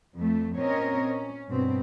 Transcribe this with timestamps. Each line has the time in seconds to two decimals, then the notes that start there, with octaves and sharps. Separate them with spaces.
0.17 F2 A3
0.58 A#2 C4 C#4 A#4 C#5 D#5
1.08 C#4
1.49 G2 B2 C4